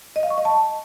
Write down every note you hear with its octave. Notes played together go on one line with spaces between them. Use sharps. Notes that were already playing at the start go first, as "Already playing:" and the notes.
D#5
F5
C#6
D#5
A5